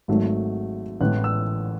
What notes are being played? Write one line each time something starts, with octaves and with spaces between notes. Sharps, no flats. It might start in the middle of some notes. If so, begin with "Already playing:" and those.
G#1 G#2 F#3 A3
A1 A2 E3 G#3 B3 F#6
E6